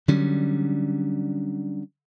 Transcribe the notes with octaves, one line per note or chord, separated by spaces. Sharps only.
D3 F#3 G3 C#4